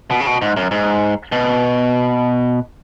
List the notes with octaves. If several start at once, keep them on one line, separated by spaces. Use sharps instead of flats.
B2
C#3
B2
G#2
F#2
G#2
B2